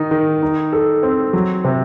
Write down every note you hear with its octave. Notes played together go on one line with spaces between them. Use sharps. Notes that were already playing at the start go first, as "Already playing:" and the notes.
Already playing: D#3 D#4
D#3
D#4
A4
C4
F#3
C3